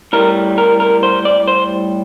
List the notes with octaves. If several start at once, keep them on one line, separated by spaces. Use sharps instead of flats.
A2 G3 A#4
A#4
A#4
C5
D5
C5